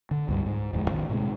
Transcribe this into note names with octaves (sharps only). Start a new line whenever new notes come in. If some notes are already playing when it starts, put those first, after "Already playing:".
D3
C#2 G2 G3
G#2
D1 F2 G#3
B1 D#3
A2 C3 G#3